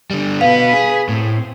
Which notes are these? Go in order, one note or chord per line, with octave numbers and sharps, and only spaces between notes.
D3 G3
B2 B3 B4 F5
G#4
A2 C4